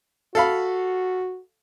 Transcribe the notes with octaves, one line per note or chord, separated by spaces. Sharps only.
F#4 A4 F5 B5